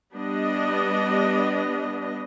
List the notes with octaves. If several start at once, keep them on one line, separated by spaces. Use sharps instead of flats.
G3 B3 D4 D#5